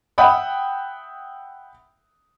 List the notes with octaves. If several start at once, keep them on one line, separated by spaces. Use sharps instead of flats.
E5 F#5 G5 B5 D#6